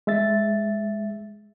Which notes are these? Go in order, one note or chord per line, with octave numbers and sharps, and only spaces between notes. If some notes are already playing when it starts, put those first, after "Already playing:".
G#3 E5 A6